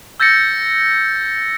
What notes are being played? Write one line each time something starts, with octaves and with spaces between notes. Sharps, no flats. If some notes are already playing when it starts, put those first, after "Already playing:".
E6 G6 A6 A#6 C#7